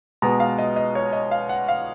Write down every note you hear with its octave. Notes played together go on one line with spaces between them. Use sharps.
B2 G#3 B3 A#5
F5
D#5
D#5
C#5
D#5
F5
F#5
F5